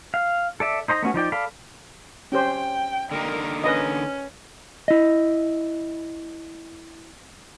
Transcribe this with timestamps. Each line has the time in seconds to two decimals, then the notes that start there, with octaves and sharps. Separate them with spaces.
0.14 F5
0.60 A4 D5 E5
0.88 D#4 C5 D#5 A#5
1.02 A3 B3 C#4 F#4
1.14 F3 D#4 D5 G5
1.32 A4 D5 F5 B5
2.32 C#4 G4 C5 G5
3.11 D3 A#3 D#4 A#4
3.64 C#4 B4 D#5
4.88 E4 D#5